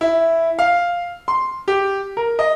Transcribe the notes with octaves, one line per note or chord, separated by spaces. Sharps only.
E4
F5
C6
G4
A#4
D#5